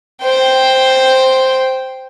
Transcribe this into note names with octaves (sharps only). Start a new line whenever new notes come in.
C5 G5